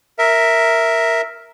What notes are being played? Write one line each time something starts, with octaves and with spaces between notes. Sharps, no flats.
A#4 E5